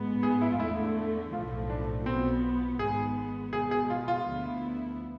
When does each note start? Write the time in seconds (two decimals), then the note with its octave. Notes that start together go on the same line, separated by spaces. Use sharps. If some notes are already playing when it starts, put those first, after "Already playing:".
Already playing: A1 G#2 G#3 B3
0.23 G#4
0.41 E4
0.52 F4
0.60 E2 D3 A3 E4
1.33 B1 A2 F3 A3 F4
1.70 D4
2.06 B1 B2 B3 C4 F4
2.79 G#1 G#2 G#3 B3 G#4
3.53 B2 G#3 B3 G#4
3.71 G#4
3.90 F4
4.08 F4
4.26 D2 D3 F3 B3 E4